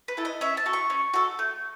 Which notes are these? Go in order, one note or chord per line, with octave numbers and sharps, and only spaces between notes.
B4
E4 A4
D#5
C#4 E5
A5
F#4 A4
C#6
C#4
F#4 A4
A3